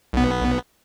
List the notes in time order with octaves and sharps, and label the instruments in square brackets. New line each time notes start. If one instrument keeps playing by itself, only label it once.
[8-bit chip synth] B1 B3